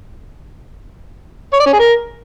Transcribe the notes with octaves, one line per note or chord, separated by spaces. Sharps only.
C#5
D5
C#4
G#4
A#4